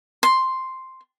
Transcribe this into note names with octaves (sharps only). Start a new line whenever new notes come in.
C6